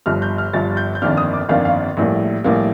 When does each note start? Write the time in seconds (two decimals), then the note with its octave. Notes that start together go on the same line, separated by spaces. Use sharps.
0.06 G1 G2 F3 F6
0.22 G6
0.38 F6
0.53 G1 G2 F3 A6
0.77 G6
0.95 G6
1.02 G1 F2 D#3 A#3 D4 F6
1.17 D#6
1.33 D6
1.49 G1 F2 D#3 A#3 D4 F5
1.65 F5
1.97 A#1 A2 G3 A#3
2.44 A#1 A2 G3 A#3